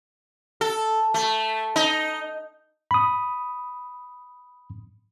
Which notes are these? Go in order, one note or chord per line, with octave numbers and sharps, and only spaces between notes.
A4
A3
D#4
B5 D#6